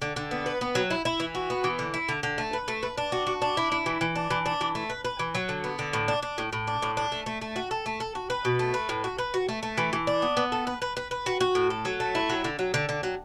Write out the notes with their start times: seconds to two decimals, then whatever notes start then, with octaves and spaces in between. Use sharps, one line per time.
0.02 D3
0.16 D3
0.31 B3
0.46 B4
0.61 B3
0.75 F#3
0.91 E4
1.05 E4
1.20 E3
1.35 F#4
1.50 B3
1.64 E3
1.79 D3
1.94 E4
2.09 D3
2.23 D3
2.38 A3
2.53 B4
2.68 A3
2.83 B4
2.98 D4
3.12 F#4
3.27 F#4
3.42 D4
3.57 E4
3.72 E4
3.86 E3
4.01 E3
4.16 D4
4.30 E3
4.46 D4
4.61 E3
4.75 A3
4.90 B4
5.05 B4
5.19 E3
5.35 F#3
5.49 D3
5.64 B3
5.79 D3
5.93 A2
6.08 D4
6.23 D4
6.38 A2
6.53 A2
6.67 D4
6.82 A2
6.97 D4
7.12 A3
7.26 A3
7.41 A3
7.56 F#4
7.71 A4
7.86 A3
8.00 A4
8.15 F#4
8.30 B4
8.45 B2
8.59 A3
8.74 B4
8.89 A2
9.04 F#4
9.18 B4
9.34 F#4
9.49 A3
9.63 A3
9.78 E3
9.93 E3
10.07 D4
10.22 B3
10.37 B3
10.52 A4
10.67 B4
10.82 B4
10.97 B4
11.11 B4
11.26 F#4
11.41 F#4
11.55 A2
11.70 A4
11.85 F#3
12.00 A3
12.15 E4
12.30 F#3
12.44 D3
12.59 F#3
12.74 D3
12.89 D3
13.03 F#3